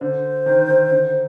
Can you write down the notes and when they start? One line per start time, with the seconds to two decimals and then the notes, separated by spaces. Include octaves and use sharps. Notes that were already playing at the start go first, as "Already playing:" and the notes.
0.01 D3 C5
0.46 D#3
0.69 D#3
0.91 D3